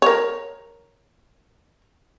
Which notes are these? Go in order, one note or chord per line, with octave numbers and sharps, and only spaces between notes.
A#4 C#5